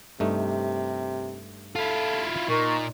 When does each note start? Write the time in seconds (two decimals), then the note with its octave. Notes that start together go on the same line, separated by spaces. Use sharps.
0.20 G2 C3 A3 D#4
1.75 E4 F4 A4
2.48 A#2 D#4 A#4 C#6